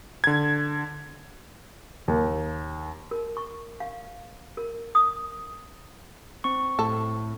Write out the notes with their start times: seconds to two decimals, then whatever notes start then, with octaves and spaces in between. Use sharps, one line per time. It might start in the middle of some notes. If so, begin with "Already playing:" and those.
0.24 D3 G#6
2.08 D#2
3.11 A#4
3.37 C#6
3.80 F5
4.57 A#4
4.95 D#6
6.44 C4 C#6
6.79 A2 A4